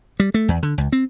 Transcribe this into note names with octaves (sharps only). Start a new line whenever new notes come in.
G3
A3
E2
D3
C#2
C4